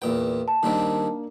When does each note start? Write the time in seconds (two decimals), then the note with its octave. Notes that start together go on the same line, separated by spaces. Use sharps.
0.02 E2 A#2 B4 G5
0.48 A5
0.63 D#3 G3 A#3 C4 D4